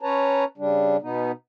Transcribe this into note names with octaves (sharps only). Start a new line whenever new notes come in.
C#4 B4 C#5 A5 A#5
C#3 G3 D4
B2 B3 D#4